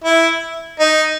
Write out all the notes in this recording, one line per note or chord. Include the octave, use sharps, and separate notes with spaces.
E4
D#4